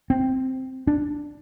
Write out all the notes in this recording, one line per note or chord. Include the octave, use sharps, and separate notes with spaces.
C4
D4